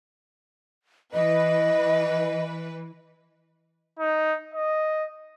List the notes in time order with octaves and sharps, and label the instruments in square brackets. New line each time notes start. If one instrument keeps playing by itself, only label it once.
[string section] E3 B4 [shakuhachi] D#5
[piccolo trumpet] D#4
D#5